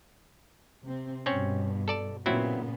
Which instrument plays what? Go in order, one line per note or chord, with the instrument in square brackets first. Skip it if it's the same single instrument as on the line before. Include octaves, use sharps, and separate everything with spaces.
[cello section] C3 C4
[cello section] G2 B2 [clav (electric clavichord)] C4 C#4 C#5
[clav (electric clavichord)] A4 D5 A5
[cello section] A#2 C#3 B3 [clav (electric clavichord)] F#3 C4 E4